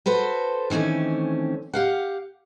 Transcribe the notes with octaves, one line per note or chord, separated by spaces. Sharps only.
F#4 A4 B4 C5
D#3 E3 A3 C4 C#4
G4 F5 F#5